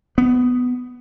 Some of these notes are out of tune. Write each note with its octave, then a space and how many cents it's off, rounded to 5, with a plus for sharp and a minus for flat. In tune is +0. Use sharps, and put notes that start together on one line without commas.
B3 +10